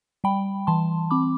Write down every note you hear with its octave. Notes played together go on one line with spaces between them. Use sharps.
G3 G5 B5
E3 A5 C6
C4 B5 D6